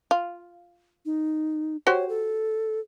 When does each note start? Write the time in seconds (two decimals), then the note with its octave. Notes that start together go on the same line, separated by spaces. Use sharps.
0.11 F4
1.06 D#4
1.87 F#4 G4 C5 C#5
2.09 A4